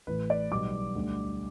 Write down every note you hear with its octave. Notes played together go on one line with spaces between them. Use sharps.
A1 A2 E3 B4
D5
B1 B2 G3 D6
D2 D3 G3